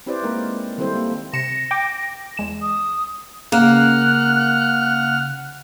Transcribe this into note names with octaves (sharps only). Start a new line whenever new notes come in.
C4 E4 G4 B4 C5 D5
G#3 A#3 C4 D#4 A#4
D#3 G3 C4 E4 A4 C5
A#3
C3 A#6 C#7 E7
G5 D6
E2 G#3 E7
D#6
C#3 A#3 F#5 F6 F#6